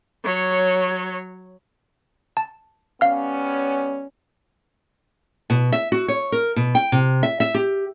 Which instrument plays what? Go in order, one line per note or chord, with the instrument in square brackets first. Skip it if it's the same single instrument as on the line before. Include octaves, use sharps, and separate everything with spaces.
[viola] F#3 C#5
[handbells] A5
[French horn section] G3 B3 C#4 [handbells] F5 F6
[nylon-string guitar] B2
E5
F#4
C#5
A#4
B2
G5
C3
E5
E5
G4